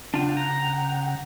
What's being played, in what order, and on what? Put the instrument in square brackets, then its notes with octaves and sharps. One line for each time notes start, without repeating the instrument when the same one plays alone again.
[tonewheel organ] C#3 F#5 G5 [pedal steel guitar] D4 F4
[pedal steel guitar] A#5